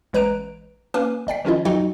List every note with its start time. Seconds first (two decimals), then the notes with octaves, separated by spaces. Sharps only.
0.13 A1 G#3 B4 A#5 F#6 D7
0.94 A#3 C#4 B4 G#5 D6 F6
1.27 G1 D5 G5 B6
1.45 D#3 F3 C#4 E4 F4 D#5
1.65 F2 F#3 D#4 F#4 D#5 G5